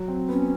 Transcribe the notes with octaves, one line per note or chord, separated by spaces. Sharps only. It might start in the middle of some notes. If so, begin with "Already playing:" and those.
Already playing: F#3
C4
B3 C#4